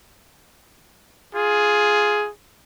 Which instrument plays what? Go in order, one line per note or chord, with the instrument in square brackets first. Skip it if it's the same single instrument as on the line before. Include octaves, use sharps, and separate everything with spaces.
[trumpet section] F4 G#4